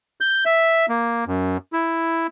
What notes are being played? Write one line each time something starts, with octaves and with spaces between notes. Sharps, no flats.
G6
E5
A#3
F#2
E4